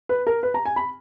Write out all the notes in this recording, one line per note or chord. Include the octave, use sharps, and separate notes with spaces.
B4
A#4
B4
A#5
G#5
B5